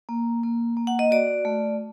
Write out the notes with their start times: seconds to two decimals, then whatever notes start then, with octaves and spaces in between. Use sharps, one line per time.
0.09 A#3
0.43 A#3
0.77 A#3
0.87 F#5
0.99 D#5
1.11 F#4 D5
1.45 A3